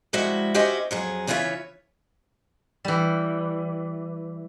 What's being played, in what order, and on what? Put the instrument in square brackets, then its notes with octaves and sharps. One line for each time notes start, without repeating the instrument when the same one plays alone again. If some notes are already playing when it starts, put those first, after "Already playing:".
[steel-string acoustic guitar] F3 G3 G#3 E4 F#4 E5
C#4 F#4 G4 C5 D#5 E5
F2 F#3 G#4
C#3 E3 F4 F#4 C#5 E5
[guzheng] E3 G3